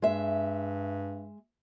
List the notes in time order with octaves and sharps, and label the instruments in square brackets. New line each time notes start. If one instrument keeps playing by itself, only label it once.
[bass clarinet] G2 [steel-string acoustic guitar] G#3 E5